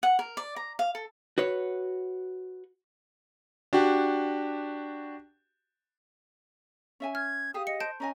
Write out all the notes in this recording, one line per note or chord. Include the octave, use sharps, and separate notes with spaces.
F#5
A#4
D5
A#5
F5
A4
F#4 B4 C#5
D4 F#4 G4
C#4 E5 G#5
F6 G#6
G4 G#4 F5 D#6
D#5 C#7
C5 A5 G6 D7
C#4 D#5 G#5 A#5